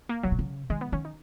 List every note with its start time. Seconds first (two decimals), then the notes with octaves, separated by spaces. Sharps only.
0.09 A#3
0.23 C#3 F#3
0.32 B2
0.39 C#3
0.70 D#3 G#3
0.81 B3
0.92 D#3 C#4
1.05 D#4